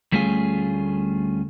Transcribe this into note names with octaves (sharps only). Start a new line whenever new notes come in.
D2 G3 A3 C#4 F4 G#4